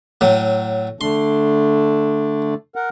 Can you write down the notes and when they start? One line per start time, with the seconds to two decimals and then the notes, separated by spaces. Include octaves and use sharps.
0.21 A2 F#3
1.01 D3 A3 D4 C6
2.75 A#4 F#5